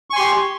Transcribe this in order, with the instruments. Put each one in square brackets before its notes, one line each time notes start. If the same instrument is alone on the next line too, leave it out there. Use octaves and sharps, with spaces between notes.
[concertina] C#6
G#5
C6
G4